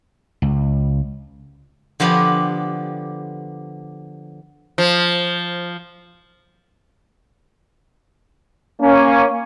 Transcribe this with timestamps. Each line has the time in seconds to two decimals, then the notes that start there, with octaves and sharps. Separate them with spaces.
0.42 C#2
2.00 D3 F3 B3 G4
4.78 F3
8.80 A#3 C#4